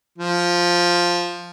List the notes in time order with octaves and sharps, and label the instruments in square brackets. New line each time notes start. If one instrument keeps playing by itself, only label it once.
[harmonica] F3